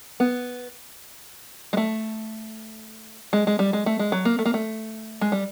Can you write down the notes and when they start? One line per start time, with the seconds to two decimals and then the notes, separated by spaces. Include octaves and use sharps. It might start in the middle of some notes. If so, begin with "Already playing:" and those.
0.20 B3
1.73 G#3
1.77 A3
3.33 G#3
3.47 G#3
3.59 G3
3.73 G#3
3.86 A3
3.99 G#3
4.12 F#3
4.25 A#3
4.39 A3
4.46 A#3
4.54 A3
5.21 G#3
5.32 G3